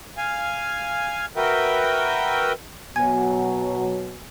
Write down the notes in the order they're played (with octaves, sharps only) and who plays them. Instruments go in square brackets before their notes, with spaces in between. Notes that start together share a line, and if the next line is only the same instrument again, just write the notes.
[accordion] F5 G#5
F#4 A#4 B4 E5 G5
[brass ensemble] B2 F#3 [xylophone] G#5 G#6